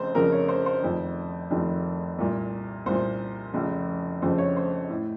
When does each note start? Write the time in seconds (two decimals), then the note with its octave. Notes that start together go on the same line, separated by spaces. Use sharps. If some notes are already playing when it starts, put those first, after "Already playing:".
Already playing: F1 F2 C#3 C5
0.15 F1 F2 C#3 A#4
0.32 C#5
0.48 C5
0.66 C5
0.82 F1 F2 D#3
1.51 F1 F2 D#3
2.19 C2 A#2
2.86 C2 A#2 C5
3.53 F1 F2 C#3
4.22 F1 F2 C#3 C5
4.38 C#5
4.56 C5
4.89 A2